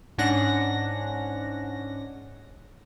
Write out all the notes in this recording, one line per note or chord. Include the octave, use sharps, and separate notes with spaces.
G#2 C#4 D4 F#5 A#6